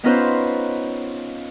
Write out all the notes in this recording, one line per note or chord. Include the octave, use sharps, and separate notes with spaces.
B3 C#4 D#4 F4 B4 C5